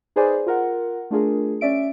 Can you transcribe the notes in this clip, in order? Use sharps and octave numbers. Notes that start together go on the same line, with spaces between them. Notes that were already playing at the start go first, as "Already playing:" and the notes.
D#4 G#4 B4 C5 D5 G#5
F4 A#4 F#5
A3 D4 F4 G#4 A#4
C#4 D5 E5 D7